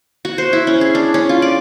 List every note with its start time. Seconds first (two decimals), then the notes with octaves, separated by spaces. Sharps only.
0.25 F#4
0.38 C5
0.53 E4
0.67 C#4
0.81 G#4
0.95 D4
1.14 C#4
1.29 F4
1.42 D5